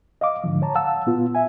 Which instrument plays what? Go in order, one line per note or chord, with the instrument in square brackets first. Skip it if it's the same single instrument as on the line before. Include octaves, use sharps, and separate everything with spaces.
[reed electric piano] D#5 F5 D6
G#2 D3 F3
C#5 A5 A#5
F5 F#5 A5 E6
A#2 B3 F4
E5 G#5